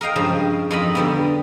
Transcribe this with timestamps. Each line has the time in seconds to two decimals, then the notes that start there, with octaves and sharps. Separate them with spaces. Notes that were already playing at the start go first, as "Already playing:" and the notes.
0.01 A#4 D#5 F5 G5
0.16 G2 C#3 F3 G#3
0.71 F2 D#4 F4 A#4 D#5 B5
0.95 D3 G3 B3